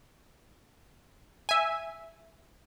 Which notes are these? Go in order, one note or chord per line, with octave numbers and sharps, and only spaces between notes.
E5 G#5